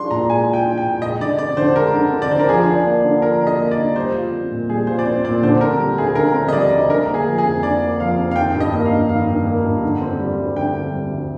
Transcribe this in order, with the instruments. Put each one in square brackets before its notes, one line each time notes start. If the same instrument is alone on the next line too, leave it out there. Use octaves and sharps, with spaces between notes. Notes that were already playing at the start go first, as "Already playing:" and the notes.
Already playing: [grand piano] G#3 D4 F4 [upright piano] C6
[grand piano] A#2 [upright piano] A#5
[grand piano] G#3 [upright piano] G#5
[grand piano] F4
[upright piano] G5
[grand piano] D4
[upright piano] G5
[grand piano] A#2
[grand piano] G#3 [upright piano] D#5
[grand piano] D3 [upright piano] D5
[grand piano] C4 [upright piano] D5
[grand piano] D3 [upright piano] C5
[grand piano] G#3 [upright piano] A#4
[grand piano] D3
C4
[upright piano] D5
[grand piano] D3 [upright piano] C5
[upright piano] A#4
[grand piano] F3 [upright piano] G#4
[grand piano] D4
A#3
D3
[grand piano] F3 [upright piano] A#4
[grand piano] D4
[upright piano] D#5
[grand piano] A#3
[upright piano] D5
[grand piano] D3
[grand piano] G3 [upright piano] C5
[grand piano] F4
C4
A#2
[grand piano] G3 [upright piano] G#4
[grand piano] F4 [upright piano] C5
[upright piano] D5
[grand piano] C4 [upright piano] C5
[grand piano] A#2 [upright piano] D5
[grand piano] D3 [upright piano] C5
[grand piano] C4 [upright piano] A#4
[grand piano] G3
[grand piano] D2 [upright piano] G#4
[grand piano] D3 [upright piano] A#4
[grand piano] C4
[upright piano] D#5
[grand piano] G3 [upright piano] D5
[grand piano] D2
[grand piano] D3 [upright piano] A#4
[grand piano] A#3
[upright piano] G#4
[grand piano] F3
[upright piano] G#4
[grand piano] F2
[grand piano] D3 [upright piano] D5
[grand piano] A#3
[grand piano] F3 [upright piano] F5
[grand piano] F2
[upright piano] F5
[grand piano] D#3 [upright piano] G5
[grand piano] G2
[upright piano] D#5
[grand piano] A#3
[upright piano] F5
[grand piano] G2
[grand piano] D#3 [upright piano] F5
[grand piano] G2
A#3
G2
D3
C4
G3
D2
[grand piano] D3 [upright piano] G5
[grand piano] C4
G3
D2